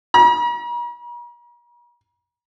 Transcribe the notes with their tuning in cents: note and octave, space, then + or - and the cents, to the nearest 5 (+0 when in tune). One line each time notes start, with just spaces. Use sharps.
A#5 +45